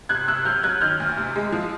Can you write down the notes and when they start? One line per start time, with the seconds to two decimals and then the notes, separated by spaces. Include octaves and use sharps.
0.09 C3 F#6 G#6
0.28 C3 E6 F#6
0.45 F#3 F6 G6
0.63 F#3 F#6 G#6
0.81 D#3 F6 G6
1.00 D2
1.17 C3
1.36 G#3
1.52 F3